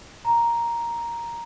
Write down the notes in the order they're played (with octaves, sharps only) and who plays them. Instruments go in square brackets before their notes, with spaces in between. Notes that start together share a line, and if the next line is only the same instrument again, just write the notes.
[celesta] A#5